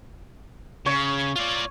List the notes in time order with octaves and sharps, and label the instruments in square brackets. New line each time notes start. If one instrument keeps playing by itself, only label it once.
[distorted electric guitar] C#3 [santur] C#5
[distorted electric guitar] F4 D5